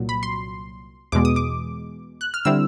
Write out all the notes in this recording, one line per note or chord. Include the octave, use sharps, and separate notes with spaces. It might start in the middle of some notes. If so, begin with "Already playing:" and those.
Already playing: C2 A#2 F#3
B5
C6
E2 B2 G#3 D6
D#6
D6
F#6
F6
D3 G3 C4 E4 E6